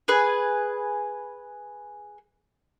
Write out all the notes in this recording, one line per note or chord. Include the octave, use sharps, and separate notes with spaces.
G#4 B4 G#5